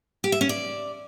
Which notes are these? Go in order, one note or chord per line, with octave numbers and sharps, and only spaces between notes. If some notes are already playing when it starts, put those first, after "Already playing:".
G4
E5
C#4
D5